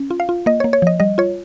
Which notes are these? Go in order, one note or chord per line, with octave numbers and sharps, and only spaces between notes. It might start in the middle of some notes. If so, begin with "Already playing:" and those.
Already playing: C#4
F4
F5
F4
A#3 D#5
C#5
A#3
C#5
F3 D#5
G3 D#5
F4 C#5